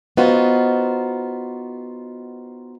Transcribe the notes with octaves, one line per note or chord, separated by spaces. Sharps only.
B3 D#4 F4 F#4 C5